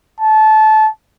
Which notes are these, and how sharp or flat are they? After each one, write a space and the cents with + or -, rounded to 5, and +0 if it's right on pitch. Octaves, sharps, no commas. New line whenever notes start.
A5 -20